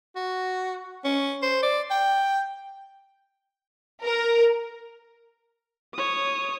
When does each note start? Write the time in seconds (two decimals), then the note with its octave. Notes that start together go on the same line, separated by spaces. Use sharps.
0.16 F#4
1.04 C#4
1.42 C5
1.63 D5
1.91 G5
4.04 A#4
5.95 C#5 D#6